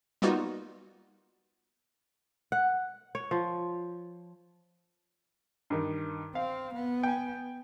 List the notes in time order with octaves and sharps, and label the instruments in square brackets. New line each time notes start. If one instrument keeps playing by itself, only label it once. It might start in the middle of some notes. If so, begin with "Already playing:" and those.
[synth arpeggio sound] G3 A#3 B3 D#4 F4 F#4
[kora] F#5
C#5
F3
[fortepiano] G2 D#3
[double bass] C4 [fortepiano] F5
[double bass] B3
[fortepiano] G5 G#5